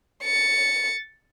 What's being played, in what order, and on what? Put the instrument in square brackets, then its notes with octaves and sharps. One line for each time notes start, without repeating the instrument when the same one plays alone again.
[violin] A6 C#7